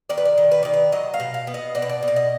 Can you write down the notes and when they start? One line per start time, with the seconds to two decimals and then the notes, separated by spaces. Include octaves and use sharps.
0.09 D#3 D5
0.18 B4
0.25 D5
0.38 D#3
0.51 B4
0.63 D#3 D5
0.74 B4
0.92 F#3 D#5
1.14 F5
1.20 B2
1.34 F5
1.47 B3
1.54 D#5
1.75 B2 D5
1.82 B4
1.89 D5
2.03 B2
2.08 D5
2.16 D#5